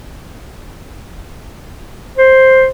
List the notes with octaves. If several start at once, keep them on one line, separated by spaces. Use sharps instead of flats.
C5